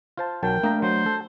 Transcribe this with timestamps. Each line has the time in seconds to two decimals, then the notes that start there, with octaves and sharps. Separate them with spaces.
0.18 F4 C5 A5
0.43 B1 F#3 A#4 G5 A5
0.63 A3 A#3 D4 A#5
0.82 F#3 C5
1.06 A4